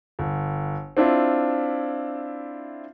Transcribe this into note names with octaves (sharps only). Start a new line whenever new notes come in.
G1
C4 D4 E4 F4